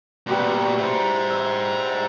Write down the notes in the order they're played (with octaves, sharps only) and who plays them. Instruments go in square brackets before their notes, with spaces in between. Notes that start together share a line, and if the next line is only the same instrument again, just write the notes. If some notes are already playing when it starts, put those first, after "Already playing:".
[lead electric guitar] A#2 B3 [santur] G3 F#4 C6
[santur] E4 [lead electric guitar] G#4 C5
[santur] E5 A#5 C6